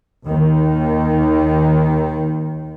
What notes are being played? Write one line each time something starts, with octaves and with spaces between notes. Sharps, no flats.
D#2 D#3